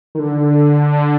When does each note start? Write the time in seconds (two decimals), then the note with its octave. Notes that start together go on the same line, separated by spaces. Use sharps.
0.15 D#3
0.19 D3